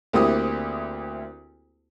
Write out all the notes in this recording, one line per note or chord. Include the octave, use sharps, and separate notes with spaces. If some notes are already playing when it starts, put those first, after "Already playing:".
D2 A#3 C4 E4 G4 D#6